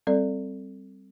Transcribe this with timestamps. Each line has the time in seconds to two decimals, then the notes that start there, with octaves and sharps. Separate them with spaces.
0.07 G3 C4 A4 D5